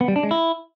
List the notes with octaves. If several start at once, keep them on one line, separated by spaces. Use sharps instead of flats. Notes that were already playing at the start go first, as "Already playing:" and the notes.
B3
G3
D4
G#3
E4